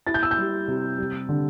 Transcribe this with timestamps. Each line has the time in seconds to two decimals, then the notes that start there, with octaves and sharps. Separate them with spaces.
0.07 E4 A6
0.14 G6
0.23 E6
0.31 G6
0.37 G3
0.68 C3
0.98 G3
1.29 D3